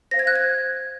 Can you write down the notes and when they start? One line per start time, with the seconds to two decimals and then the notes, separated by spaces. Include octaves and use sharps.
0.11 C5 F5 A#6
0.19 G#6
0.27 F#6
0.36 G#6